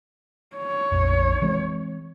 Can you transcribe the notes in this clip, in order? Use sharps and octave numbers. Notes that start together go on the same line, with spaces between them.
C#5
A#1 F2
E3 G#3 C4